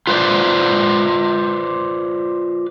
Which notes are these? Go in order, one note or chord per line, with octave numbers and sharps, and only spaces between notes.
F4 B4 C5 D5